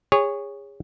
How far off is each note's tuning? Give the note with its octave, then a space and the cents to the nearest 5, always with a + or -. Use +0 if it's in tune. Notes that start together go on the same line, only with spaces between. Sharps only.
G#4 -30 C#5 +0